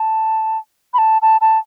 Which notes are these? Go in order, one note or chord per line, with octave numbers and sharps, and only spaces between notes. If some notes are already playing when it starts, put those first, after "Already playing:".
Already playing: A5
B5
A5
A5
A5